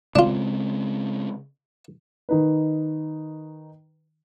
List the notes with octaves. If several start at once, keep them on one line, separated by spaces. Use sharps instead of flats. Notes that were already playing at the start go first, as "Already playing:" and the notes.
C#3 G#3 C4 D4 F4
D#3 D#4 B4